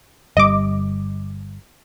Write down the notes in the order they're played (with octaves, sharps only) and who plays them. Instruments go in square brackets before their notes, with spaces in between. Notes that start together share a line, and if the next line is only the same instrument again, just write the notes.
[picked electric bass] G1 G3 [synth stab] D#5 D6